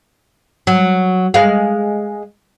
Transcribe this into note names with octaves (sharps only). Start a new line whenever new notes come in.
F#3
G#3 F5